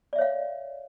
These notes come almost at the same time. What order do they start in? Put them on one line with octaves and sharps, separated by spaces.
D5 E5 C#5 F5